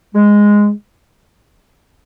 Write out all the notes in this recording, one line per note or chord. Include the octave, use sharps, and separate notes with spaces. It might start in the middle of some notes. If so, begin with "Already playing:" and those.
G#3